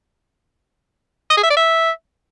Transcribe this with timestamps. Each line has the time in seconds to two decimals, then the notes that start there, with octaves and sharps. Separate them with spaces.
1.30 D#5
1.37 G#4
1.44 E5
1.50 D5
1.57 E5